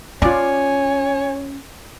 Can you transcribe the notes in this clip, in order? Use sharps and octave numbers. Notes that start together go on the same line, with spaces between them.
C#4 F4 C#5 D5 G#5